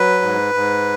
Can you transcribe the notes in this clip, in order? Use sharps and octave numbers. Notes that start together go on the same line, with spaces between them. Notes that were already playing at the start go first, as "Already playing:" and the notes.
Already playing: F#3 B4
G#2
G#2